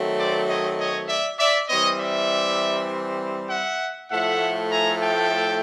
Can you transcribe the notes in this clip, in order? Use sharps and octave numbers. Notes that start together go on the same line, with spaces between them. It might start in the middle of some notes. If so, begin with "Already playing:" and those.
Already playing: D#3 F#3 A3 C4
C5 D5
C#5 D#5
C#5 D#5
D5 E5
D5 E5
E3 G3 C4 C#5 D#5
D5 E5
E5 F#5
A2 F3 A3 E5 F#5
G#5 A#5
G5 A5